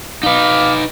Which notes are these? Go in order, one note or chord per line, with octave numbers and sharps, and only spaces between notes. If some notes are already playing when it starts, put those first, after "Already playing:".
D#4 B4 F5 D6